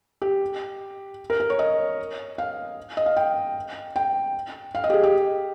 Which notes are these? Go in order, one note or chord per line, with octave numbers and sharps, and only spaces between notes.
G4
A#4
A#4
C#5
D#5
F5
D#5
F5
G5
G5
F5
D#5
G4
G#4
G4